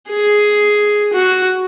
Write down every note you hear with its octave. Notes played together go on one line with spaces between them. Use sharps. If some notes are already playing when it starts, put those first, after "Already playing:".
G#4
F#4